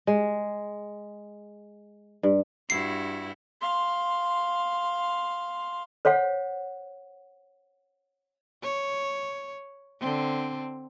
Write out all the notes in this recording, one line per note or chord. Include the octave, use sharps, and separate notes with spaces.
G#3
G2
G2 E4 F#4 C7
F5 C6
C5 C#5 F5 F#5
C#5
D3 C4